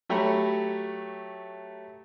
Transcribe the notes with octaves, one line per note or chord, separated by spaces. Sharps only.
F#3 A3 G4 C#5 A#5 B5